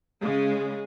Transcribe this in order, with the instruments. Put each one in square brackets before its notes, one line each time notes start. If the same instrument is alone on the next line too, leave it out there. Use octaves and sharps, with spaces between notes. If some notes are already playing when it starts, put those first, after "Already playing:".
[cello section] C#3 [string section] G#3